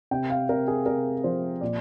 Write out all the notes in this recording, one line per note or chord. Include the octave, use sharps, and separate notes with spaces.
C3 G5
F5
C3 A#4
G#4
C3 A#4
F3 C5
A#2 D5